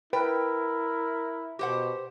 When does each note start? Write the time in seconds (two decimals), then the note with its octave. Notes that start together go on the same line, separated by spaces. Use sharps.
0.13 E4 A#4 B4 G5
1.59 B2 G4 C5 F#5